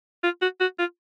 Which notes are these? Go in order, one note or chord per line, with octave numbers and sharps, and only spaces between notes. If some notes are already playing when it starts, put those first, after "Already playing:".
F4
F#4
F#4
F4